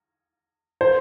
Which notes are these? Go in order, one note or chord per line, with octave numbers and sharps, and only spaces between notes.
C5